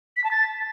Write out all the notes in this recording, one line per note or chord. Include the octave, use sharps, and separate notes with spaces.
B6
A5
A6